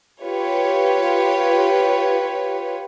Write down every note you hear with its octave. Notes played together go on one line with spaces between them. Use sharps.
F4 G4 B4 C#5